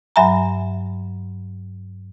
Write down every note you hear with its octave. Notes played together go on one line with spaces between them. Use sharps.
G2 F#3 E5 G#5 A#5